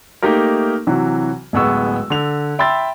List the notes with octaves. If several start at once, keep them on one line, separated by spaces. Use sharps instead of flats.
A3 A#3 D#4 G4 A#4
C3 E3 F#3 F#4
D1 A1 G#3 B3 C#6 E6
D3 F7
E5 G5 B5 C6 E6 A6